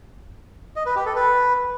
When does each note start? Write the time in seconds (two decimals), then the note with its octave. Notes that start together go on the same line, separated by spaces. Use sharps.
0.76 D#5
0.86 B4
0.96 G4
1.06 A4
1.16 B4